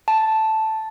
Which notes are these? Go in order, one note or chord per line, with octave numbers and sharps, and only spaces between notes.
A5